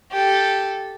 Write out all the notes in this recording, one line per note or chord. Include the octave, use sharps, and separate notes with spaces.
G4 A4